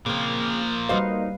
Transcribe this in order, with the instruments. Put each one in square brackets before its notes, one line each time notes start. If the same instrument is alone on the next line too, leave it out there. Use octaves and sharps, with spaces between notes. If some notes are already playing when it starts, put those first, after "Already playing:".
[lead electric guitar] A#2 F3 [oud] C#3 C4 [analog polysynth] A#3
[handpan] G3 B4 F5 [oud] D#4 F#4 C5